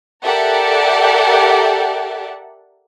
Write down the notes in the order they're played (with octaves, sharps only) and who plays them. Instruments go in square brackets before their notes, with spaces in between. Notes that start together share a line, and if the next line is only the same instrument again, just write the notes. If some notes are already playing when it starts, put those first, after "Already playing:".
[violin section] G4 A4 A#4 D5 E5 F#5